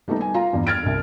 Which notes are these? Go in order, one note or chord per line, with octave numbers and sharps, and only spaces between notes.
G3 A3 B3 D#4
G#5
F4 F5 A#5
E2 G2
F6 G#6 A6 D7
G1 C2